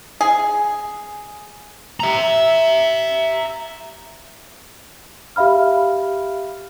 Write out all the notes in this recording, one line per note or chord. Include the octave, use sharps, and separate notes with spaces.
G#4
E5 A#5
G4 E5 F5 B5 F6